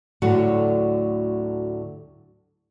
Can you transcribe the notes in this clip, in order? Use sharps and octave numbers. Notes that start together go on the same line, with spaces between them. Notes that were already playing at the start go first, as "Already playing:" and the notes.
D2 A2 D3 F#3 F#4 F#5